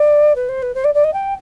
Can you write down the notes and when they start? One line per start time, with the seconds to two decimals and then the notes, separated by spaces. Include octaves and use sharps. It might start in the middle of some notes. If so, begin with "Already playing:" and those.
Already playing: D5
0.36 B4
0.49 C5
0.62 B4
0.75 C5
0.84 D5
0.94 D5
1.04 D#5
1.13 G5